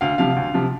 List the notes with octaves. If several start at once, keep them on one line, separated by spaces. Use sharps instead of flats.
D2 F5
C3 F3 F5
D2
C3 F3